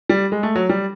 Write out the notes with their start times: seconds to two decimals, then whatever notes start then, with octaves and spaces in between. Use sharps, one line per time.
0.09 G3
0.32 G#3
0.43 A3
0.56 F#3
0.69 G3